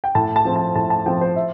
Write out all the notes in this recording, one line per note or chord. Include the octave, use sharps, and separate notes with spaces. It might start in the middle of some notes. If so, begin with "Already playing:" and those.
G5
A2 A5
A5
F3 C4
A5
A2 A5
A5
F3 C4 G5
C5
E5